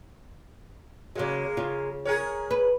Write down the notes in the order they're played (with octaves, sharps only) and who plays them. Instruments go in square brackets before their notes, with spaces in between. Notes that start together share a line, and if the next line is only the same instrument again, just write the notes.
[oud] C#3 F#3 [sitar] G#3 A#3
[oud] C#3 F4
[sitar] G#4 A#4 C#5
[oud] B4